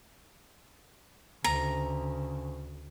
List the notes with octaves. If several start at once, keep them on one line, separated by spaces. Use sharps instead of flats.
D2 C#3 A#5